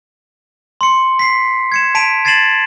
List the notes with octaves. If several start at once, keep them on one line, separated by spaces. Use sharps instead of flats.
C6 C#7
B6 C7
G#6 C#7 E7
A5 B6 D7 D#7 F7
G#6 A6 C7 D#7 E7 F#7